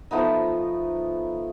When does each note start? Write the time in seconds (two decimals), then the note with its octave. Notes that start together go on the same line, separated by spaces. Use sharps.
0.11 F3 A3 B3 D#4